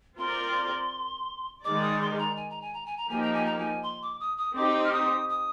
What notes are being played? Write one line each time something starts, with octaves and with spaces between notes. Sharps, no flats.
C4 F4 A#4 D5 C6
D#3 G#3 D#4 A#4 D5 D6
D#6
C6
A#5
G#5
A#5
G#5
A#5
G#5
A#5
F3 A#3 D#4 G4 G#5
A#5
G#5
A#5
G#5
C6
D6
D#6
D#6
C4 D#4 G4 D6
F6
D#6
D#6